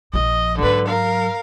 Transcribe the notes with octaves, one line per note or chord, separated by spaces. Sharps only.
A#1 F3 D#5
G#2 D3 F#3 B4
A#4 F5